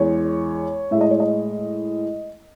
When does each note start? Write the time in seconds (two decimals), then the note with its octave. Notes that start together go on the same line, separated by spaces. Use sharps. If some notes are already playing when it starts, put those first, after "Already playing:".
Already playing: E2 G#3 C#5
0.91 A2 G#3 E5
1.01 D#5
1.11 C#5
1.20 D#5